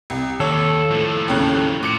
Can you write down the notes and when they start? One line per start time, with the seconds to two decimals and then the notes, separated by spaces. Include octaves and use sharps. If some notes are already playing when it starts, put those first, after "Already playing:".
0.10 C2
0.40 D#2 A4 C#5
0.91 A2 F3
1.28 D#2 C#3 F#6
1.83 A#2 D6 C#7